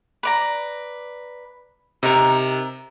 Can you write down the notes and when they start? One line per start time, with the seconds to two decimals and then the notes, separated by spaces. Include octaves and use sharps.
0.23 B4 D5 A#5
2.03 C3 D#4 A#4